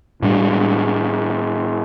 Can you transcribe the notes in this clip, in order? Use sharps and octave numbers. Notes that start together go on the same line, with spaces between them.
A2 G3 D4